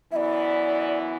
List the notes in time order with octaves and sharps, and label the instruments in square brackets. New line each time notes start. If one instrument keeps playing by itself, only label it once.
[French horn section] F#2 E3 B3 E4 [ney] D5 E5